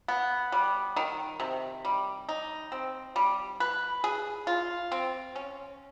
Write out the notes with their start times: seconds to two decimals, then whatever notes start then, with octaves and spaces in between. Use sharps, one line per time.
0.08 B3
0.52 G3
0.96 D#3
1.40 C3
1.85 G3
2.29 D#4
2.72 C4
3.16 G3
3.60 B4
4.04 G#4
4.47 F4
4.92 C4
5.36 C#4